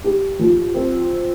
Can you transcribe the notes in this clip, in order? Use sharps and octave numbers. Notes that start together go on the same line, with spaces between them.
G4
F3
C4